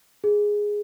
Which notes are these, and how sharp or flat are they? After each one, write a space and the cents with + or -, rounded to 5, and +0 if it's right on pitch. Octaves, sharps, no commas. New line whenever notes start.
G#4 -5